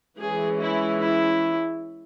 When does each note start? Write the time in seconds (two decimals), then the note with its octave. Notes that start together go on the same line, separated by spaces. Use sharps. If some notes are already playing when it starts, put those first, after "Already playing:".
0.18 E3 G#3 C#4 G#4
0.58 E4
0.99 E4